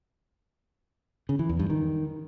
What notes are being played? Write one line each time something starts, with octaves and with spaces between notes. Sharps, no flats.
C#3
E3
E2
G2
D#3